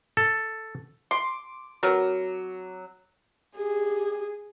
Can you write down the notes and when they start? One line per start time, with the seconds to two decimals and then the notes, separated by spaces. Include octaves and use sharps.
0.17 A4
1.11 C6 D6
1.83 F#3 C4 A#4 B4
3.56 G4 G#4